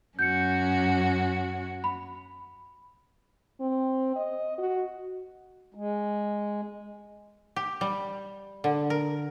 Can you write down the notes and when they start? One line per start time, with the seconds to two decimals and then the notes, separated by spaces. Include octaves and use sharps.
0.19 F#2 C#4 F#4 G6 C#7
1.84 B5
3.60 C4
4.16 D#5
4.58 F#4
5.74 G#3
7.56 G4
7.81 G3
8.64 D3
8.90 A#4